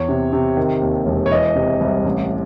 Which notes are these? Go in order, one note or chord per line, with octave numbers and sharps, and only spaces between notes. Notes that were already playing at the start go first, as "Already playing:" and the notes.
Already playing: E2 C#5
C3
C3
D#3
D#2
E1
C#5
E3 D#5
C3
C2
A1